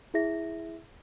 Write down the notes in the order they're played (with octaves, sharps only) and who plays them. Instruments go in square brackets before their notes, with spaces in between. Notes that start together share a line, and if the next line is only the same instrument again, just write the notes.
[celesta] E4 G#4 E5 A#6